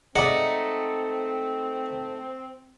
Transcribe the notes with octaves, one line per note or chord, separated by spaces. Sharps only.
G#3 A3 C4 D#4 D5 F#5